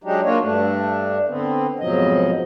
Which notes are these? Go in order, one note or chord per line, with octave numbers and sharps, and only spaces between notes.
F#3 G#3 D4 D#4 G4
A#3 D4 F4 F#4 C#5
G2 A3 D4
D3 B3 C4
F2 G#2 B2 F3 F#3 D#5